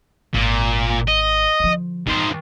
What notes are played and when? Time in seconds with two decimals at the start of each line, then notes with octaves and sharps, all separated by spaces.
0.34 G#1 A#2 C4
1.08 D#5
1.60 D3 F3
2.07 G2 D#3 A3 C5